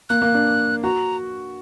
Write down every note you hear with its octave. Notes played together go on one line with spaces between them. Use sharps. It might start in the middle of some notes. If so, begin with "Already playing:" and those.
A#3 F#6
A#3
D4
F#4 A#5